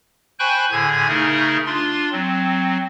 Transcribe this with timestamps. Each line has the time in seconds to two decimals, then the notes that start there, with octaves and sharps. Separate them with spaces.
0.39 C5 G5 G#5 B5 C#6 F#6
0.72 A2 D3 G#4 G#5 G#6
1.08 C#3 A3 D#4 G#4 A#4
1.66 D4 F4 C6
2.12 F#3 C4